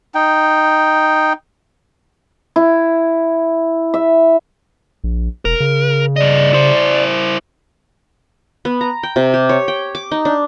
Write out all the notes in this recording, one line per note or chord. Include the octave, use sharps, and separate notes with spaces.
D#4 G5
E4
E5
A#1
E1 A#4
C#3
G2 D5 D#5
E4 C5
B3
A#5
G5
C3
G4
C#5
G5
D6
D#4
D4